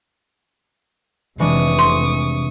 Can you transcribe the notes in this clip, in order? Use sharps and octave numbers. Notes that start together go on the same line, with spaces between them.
F1 E3 G#3 D4 C#6 D#6
C6